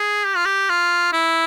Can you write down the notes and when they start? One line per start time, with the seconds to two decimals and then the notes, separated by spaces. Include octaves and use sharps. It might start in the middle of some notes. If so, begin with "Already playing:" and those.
Already playing: G#4
0.26 G4
0.36 F4
0.46 G4
0.70 F4
1.13 E4